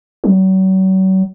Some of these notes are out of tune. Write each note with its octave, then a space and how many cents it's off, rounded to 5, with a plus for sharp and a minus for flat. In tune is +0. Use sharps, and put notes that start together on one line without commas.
F#3 +40